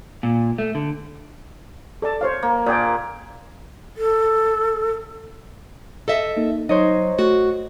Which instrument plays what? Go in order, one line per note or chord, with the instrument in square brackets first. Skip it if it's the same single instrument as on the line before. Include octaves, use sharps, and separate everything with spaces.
[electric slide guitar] A#2
A3
D3
[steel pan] A4 D5 A5
C5 C#5 F5
[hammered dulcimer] A#3
[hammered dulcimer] A#2 G#4 [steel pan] D5 G5
[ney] A4
[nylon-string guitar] A4 D#5 E5
[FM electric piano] A#3 D#4
[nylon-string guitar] F#3 [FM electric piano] D#4 [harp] C5 C#5 D#5
[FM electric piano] A3 [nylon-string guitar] F#4